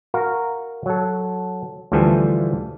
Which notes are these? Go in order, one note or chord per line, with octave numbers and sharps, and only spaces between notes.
F#4 A#4 F5
F#3 A4
D2 E3 F3 G3 A4 G#5